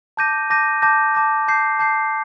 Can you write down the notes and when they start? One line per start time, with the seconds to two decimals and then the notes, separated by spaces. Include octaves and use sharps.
0.17 A5 D6 G6 A#6 D#7
0.50 A5 D6 G6 A#6 D#7
0.82 A5 D6 G6 A#6
1.15 A5 D6 G6 A#6
1.48 A5 D6 G6 C7
1.79 A5 D6 G6 C7